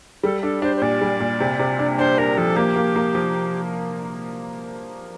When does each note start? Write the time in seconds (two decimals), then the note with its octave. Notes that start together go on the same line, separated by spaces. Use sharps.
0.23 G3 A4
0.42 D4 A4
0.62 D4 C5
0.76 C5
0.82 A#2 D5
1.01 G3
1.20 A#2
1.40 C3
1.59 C3
1.79 D4
1.99 D4 C5
2.18 D4 A#4
2.37 F3 A4
2.56 A#3 G4
2.76 A#3
2.96 A#3
3.15 F3